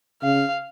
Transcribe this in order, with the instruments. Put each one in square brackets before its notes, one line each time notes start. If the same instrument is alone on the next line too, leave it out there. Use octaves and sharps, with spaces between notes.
[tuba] C#3 [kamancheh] F5